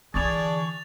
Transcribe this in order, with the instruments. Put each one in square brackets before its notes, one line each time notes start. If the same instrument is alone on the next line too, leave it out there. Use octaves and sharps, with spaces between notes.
[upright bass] D3 E3 [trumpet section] D4 G#4 D5 [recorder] C#6 [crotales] A6 F7